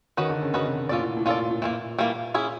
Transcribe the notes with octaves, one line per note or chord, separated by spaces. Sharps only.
D#3 C#4 F#4 B4 D#5
D3
C#3
C#3 C#4 F#4 B4 D#5
C3
A#2 C#4 F4 A4 D5
A2
A2
A#2 C#4 F4 A4 D5
A2
A#2 E3 G3 A#3
E3 G3 A#3
C#4 E4 G#4